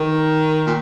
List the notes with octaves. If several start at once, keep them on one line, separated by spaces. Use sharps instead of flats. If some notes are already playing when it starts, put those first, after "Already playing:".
Already playing: D#3
A#2